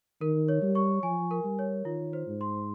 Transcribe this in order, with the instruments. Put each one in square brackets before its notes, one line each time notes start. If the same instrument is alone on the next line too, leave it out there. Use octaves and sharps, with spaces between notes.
[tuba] D#3 [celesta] A#4
[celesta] C#5
[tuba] G3
[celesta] C#6
[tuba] F3 [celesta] G#5
[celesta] A#4
[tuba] G3
[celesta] C#5
[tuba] D#3 [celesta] F4
[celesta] C5
[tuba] G#2
[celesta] C6